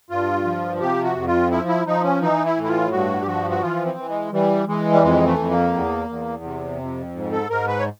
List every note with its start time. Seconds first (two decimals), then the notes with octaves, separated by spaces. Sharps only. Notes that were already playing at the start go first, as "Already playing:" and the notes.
0.10 G2 F4
0.45 F3
0.81 C3 G4
1.04 F#4
1.16 F2
1.27 F4
1.51 F3 E4
1.68 E4
1.86 F3 D#4
2.04 C#4
2.22 E3 D#4
2.45 E4
2.57 A2
2.64 E4
2.68 F4
2.92 G2 F#4
3.21 G4
3.27 F3 F#4
3.50 F#4
3.62 E3 F4
3.86 C4
3.98 E3
4.09 G#3
4.33 E3 G3
4.67 E3 G#3
4.93 G3
5.03 F2 G#3
5.27 A3
5.39 F2
5.50 A#3
5.74 E2
6.09 E2
6.44 C3
6.80 F2
7.15 G#2
7.32 A4
7.50 G#2 A#4
7.68 B4
7.79 C#5